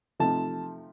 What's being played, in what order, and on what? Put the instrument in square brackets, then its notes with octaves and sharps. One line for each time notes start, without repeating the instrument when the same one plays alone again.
[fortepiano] C3 F3 A3 D#4 [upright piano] A5